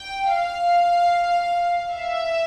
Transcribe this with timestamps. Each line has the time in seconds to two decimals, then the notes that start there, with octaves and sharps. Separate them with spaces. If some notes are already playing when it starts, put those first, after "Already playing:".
Already playing: G5
0.31 F5
1.91 E5